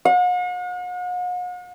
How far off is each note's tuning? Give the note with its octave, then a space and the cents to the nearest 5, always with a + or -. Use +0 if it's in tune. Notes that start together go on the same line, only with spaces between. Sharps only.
F#5 -45